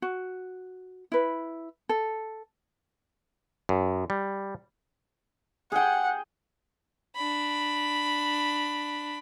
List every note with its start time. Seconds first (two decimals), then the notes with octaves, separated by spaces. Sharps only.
0.02 F#4
1.12 E4 B4
1.89 A4
3.69 F#2
4.10 G3
5.72 G#4 F#5 G5
7.16 D4 B5